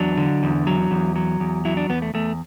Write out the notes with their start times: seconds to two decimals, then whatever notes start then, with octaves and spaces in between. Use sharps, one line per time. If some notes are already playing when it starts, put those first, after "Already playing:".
Already playing: E2 F#3 D4
0.17 D3
0.43 E2
0.67 F#3
0.91 E2
1.16 F#3
1.40 E2
1.65 F#3 E4
1.77 D4
1.89 E2 B3
2.02 A3
2.14 E2 A3